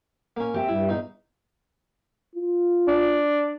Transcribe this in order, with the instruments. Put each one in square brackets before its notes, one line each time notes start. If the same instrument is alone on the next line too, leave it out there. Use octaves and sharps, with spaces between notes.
[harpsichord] A#3 C#4
[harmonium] C4 [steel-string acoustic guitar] G4 E5
[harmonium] G2 G3 [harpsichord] E4
[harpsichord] E2 D#4
[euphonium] F4
[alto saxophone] D4